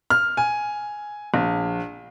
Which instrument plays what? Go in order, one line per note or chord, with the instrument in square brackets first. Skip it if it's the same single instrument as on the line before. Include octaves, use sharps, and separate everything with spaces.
[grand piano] F6
G#5
A#1